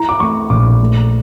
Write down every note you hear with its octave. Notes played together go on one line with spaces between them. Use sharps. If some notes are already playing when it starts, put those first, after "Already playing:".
Already playing: E4 A#5
D6
A3 C#6
A#1 D6
A3